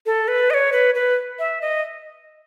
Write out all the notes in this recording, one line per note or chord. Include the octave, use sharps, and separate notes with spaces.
A4
B4
D#5
C#5
B4
B4
E5
D#5